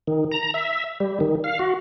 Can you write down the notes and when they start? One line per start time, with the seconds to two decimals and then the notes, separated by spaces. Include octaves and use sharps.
0.07 D#3
0.32 A#5
0.54 E5
1.00 G3
1.20 D#3
1.44 F5
1.59 F#4